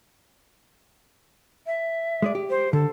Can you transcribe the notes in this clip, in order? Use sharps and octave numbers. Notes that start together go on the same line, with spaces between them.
E5
G#3 G#4 D5
G4
C5
D3 A4